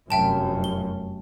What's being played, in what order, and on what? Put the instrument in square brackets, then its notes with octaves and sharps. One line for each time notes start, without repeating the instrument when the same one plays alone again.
[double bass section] F1 F#2 [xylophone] E5 G5 A5
[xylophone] G7